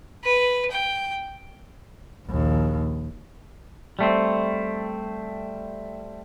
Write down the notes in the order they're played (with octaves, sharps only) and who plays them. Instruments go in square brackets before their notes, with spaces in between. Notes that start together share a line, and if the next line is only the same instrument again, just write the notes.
[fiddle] B4
G5
[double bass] A#1 D#2
[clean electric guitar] G3 A3 C4